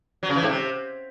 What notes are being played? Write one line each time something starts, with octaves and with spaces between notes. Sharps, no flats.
F#3
C#3
E3
G#2
C3